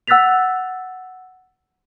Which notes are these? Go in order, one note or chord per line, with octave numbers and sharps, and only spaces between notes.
F#5 E6 F#6 A6 B6 F7